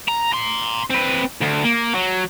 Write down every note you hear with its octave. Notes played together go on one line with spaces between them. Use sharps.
A#5
A#5 C6
C4 B4
D2
A#3
F#3